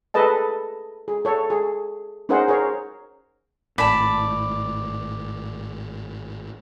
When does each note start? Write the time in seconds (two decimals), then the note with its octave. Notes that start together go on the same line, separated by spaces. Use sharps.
0.14 G#4 A4 B4 D#5 A5
1.08 G#4
1.25 A4 C#5
1.50 G#4
2.29 C#4 D#4 G#4 A#4 C5 F#5
2.48 G#4 A#4 C#5
3.78 G#1 A2 D5 A5 B5